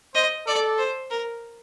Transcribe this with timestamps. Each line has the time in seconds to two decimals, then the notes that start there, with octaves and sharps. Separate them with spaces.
0.14 C5 D#5
0.46 A4 D5
0.78 C5
1.10 A#4